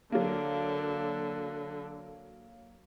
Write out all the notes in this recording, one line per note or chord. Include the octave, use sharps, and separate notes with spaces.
D3 F#3 A#3